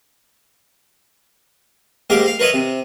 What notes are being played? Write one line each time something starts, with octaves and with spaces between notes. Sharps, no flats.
G#2 A#3 G4 A#4 D6
F5
A#4 B4 C#5 D#5 E5
C3